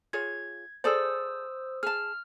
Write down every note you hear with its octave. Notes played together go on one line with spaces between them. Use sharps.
F4 G#4 C#5 G#6
G#4 A4 C5 D5 D#6 E6
G#4 A5 F6